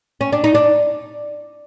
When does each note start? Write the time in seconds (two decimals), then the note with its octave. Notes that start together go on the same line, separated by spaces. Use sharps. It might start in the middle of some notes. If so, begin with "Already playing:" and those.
0.21 C#4
0.33 D4
0.44 D#4
0.55 D4